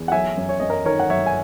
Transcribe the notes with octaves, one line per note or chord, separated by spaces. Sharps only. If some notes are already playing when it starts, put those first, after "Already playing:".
Already playing: E2
F#5
F#3 E5 G#5
F#2
C#5
F#2 D#5
A#4 C#5
D#3 A#4 C#5
F#5
F#3 C#5 E5
G#5